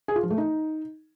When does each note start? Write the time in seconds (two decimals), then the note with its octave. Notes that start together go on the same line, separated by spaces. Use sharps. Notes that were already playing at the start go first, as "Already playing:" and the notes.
0.08 G#4
0.16 F4
0.23 F3
0.30 A3
0.38 D#4